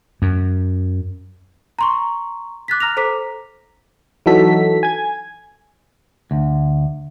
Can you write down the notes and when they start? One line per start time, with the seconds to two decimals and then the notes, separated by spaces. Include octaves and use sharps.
0.22 F#2
1.79 A#5 C6 C#6
2.68 D6 F#6 A6 B6
2.80 A#5 F6 A#6 F7
2.97 A4 C5 A#5 D6 B6
4.26 E3 F#3 D#4 F#4 A4 B6
4.83 G#5 G#6
6.31 D2